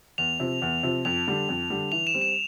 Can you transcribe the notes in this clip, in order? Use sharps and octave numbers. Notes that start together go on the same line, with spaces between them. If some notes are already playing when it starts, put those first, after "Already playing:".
E2 F7
C3 F3
E2
C3 F3
F2 F7
D3 G3 D4
F2
D3 G3 D4
E3 F7
E7
G3 C4
E7